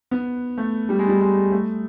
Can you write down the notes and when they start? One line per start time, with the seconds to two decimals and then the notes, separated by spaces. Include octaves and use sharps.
0.11 B3
0.58 A3
0.89 G3
0.99 G#3
1.08 G3
1.21 G#3
1.52 A3